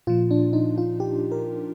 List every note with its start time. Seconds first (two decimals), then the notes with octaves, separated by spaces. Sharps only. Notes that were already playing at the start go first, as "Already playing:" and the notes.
0.07 A#2 F3 F4
0.31 D4
0.53 D#4
0.78 F4
1.00 G4
1.32 A#4